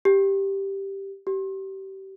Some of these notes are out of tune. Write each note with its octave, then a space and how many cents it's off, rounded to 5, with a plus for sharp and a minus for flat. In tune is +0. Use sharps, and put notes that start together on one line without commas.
G4 +0
G4 -25